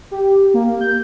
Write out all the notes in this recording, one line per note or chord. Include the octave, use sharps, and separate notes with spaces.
G4
A#3
G6